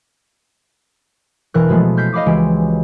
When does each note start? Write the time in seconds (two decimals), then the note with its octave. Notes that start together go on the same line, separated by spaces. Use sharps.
1.54 E1 E3 A#4 F#6
1.69 B2 F3 G#3 A3 B3
1.97 F6 G6 B6 C7
2.13 D#5 F5 B5 D6 D#6
2.26 C#2 E3 G#3 F#4 G4 D7